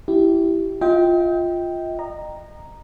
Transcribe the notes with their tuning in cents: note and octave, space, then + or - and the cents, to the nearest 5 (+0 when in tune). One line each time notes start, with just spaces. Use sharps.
E4 +0 G4 -15
F4 +0 D#5 +45 G5 +0
D#5 -30 A#5 +0